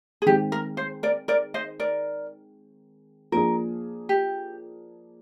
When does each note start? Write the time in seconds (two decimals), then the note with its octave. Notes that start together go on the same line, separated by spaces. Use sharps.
0.22 G#4
0.26 D#3 G#3 C4 G4
0.52 A#4
0.77 C5
1.03 A#4 D5
1.28 A#4 D5
1.54 C5 D#5
1.80 A#4 D5
3.32 F3 A#3 D4 G#4 A#4
4.09 G4